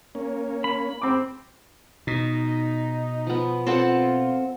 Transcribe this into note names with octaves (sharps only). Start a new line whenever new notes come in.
A#3 C#4
B5
C4 D6
B2 D#4
F3 B3
C4 F4 A4 F#5